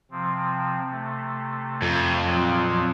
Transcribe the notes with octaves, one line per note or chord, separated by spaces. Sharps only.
C3 F3 C4
C3 A3
F2
A#2 F3 F#3